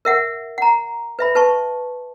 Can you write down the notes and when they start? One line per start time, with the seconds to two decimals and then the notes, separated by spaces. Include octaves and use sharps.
0.05 A#4 E5 F#5
0.58 F#5 A#5
1.19 B4 E5 B5
1.35 B4 A5 C#6